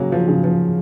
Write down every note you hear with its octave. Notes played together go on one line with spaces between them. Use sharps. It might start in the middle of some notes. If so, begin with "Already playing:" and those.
Already playing: C#3 F#3 A#3
F3
C#3
F3